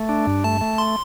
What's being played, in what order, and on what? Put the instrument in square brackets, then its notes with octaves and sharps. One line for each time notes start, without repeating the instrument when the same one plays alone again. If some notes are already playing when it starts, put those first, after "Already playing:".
Already playing: [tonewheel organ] A3
D4
G2
[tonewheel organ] A3 [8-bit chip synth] A5
[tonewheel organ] A3
[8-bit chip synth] C6